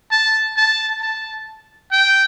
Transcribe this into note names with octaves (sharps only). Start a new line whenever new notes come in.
A5
A5
A5
G5